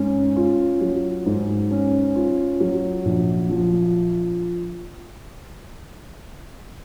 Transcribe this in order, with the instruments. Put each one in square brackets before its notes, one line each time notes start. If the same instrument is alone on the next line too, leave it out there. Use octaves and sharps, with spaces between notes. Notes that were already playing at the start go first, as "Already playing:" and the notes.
Already playing: [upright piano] G#2 C#4
F4
F#3
G#2
C#4
F4
F#3
A#1
F3